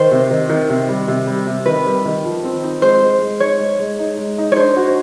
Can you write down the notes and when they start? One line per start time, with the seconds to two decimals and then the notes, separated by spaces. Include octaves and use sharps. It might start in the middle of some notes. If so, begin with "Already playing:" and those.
Already playing: D#3 C5
0.11 C3
0.31 D#3
0.49 D#3
0.70 C3
0.89 G3
1.08 C3
1.27 G3
1.47 C3
1.66 D#3 B4
1.86 G3
2.05 D#3
2.25 F3
2.44 C4
2.63 D#4
2.82 G#3 C5
3.01 G#3
3.22 G#3
3.40 D#4 C#5
3.60 G#3
3.79 G#3
3.99 D#4
4.18 G#3
4.38 D#4
4.52 C#5
4.57 D4 C5
4.77 F#4